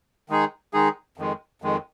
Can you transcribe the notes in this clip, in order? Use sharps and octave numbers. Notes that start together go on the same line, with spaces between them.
D#3 G#3 D#4 G#4
D#3 G#3 D#4 G#4
F2 D#3 G#3
F2 D#3 G#3